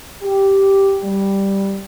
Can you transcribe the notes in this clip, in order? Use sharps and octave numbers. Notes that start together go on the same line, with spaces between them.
G4
G3